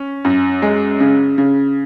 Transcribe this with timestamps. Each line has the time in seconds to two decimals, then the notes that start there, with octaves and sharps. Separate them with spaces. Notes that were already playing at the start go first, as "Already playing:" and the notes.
Already playing: C#4
0.25 F#2
0.62 G#3
1.00 C#3
1.38 C#3